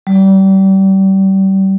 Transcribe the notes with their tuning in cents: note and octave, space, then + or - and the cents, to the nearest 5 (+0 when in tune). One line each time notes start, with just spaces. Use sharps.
G3 -30